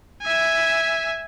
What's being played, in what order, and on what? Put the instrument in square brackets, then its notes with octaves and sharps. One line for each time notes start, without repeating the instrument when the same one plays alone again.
[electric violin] E5 G#5